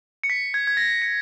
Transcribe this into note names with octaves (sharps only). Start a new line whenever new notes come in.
C#7
B6
G#6
G#6
A#6
C#7